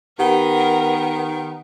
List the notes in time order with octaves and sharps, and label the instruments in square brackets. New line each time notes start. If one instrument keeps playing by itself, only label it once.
[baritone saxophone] D#3 [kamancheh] B3 [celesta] G4 F#5 G7 [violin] A#4